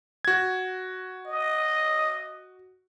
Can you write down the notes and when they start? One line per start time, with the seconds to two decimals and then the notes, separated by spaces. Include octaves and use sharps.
0.25 F#4 G#6
1.26 D#5